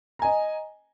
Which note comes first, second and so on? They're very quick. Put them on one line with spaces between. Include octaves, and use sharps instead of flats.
A#5 G#5 D#5